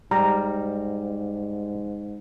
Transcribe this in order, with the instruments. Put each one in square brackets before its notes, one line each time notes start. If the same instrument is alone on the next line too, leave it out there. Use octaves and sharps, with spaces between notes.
[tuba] G#2 [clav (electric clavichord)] G3 [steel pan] A#5